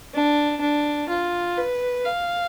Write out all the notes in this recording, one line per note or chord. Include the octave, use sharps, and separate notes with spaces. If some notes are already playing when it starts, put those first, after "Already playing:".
D4
D4
F4
B4
F5